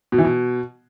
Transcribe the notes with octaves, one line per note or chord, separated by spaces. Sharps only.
B2
E3
B2